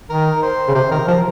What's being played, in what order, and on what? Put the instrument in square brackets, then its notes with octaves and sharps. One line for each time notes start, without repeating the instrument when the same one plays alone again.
[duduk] D#3 [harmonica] A#4
[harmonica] C5
[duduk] C#3
[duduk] C3 [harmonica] C5
[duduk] D#3 [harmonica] A#4
[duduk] F3 [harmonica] A#4